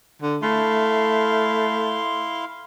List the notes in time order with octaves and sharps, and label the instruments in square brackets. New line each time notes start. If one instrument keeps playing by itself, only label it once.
[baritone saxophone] D3
[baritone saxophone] A3 [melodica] E4 F5 C6